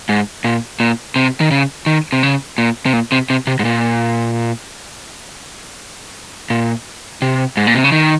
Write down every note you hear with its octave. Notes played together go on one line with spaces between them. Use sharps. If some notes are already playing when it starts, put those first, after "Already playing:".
G#2
A#2
A#2
C3
D#3
C#3
D#3
C3
C#3
A#2
C3
A#2
C3
C3
C3
G#2
A#2
A#2
C3
G#2
A#2
C3
C#3
D#3